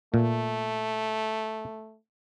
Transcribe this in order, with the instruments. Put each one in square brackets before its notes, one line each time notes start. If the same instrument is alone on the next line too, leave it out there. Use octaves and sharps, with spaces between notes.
[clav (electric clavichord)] A#2 [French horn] A3